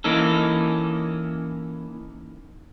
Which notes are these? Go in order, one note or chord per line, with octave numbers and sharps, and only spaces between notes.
E3 A#3 C#4 D#4 A4